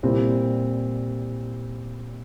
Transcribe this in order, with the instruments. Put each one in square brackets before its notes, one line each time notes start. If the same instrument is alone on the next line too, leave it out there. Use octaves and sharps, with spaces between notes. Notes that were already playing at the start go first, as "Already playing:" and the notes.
[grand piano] A#2 G3 C4 E4